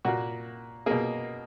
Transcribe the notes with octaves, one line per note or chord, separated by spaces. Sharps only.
A#2 A#3 F#4
B2 A#3 G#4